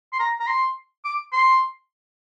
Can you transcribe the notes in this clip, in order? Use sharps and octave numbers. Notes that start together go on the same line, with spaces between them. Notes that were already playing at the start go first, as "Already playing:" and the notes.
C6
A#5
A#5
C6
D6
C6